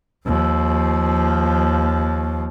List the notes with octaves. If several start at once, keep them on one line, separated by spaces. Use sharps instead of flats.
D#2 F3